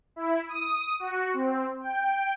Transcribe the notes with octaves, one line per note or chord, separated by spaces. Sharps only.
E4
D#6
F#4
C4
G5